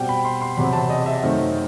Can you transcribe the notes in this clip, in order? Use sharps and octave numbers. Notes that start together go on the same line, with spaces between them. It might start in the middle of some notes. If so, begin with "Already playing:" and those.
Already playing: B2 G3 C4 G5
B5
C6
C6
E2 C3 F#3 C4 B5
A5
D#5
E5
F#2 D#3 A3 C4